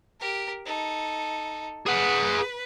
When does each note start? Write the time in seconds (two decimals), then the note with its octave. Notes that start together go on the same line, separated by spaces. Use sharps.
0.20 G4 A#4
0.66 D#4 A4
1.86 G#4 B4 F#5